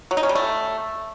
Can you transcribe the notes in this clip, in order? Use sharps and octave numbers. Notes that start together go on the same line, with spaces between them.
F#3
D#4
C#4
G3
A3